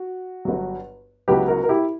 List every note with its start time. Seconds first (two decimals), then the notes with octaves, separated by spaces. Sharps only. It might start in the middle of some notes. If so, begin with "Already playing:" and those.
Already playing: F#4
0.45 G1 G2 F#3
1.28 C#2 C#3 F#3 B3 G4 B4
1.48 F#4 A#4
1.64 A#4
1.69 E4 G4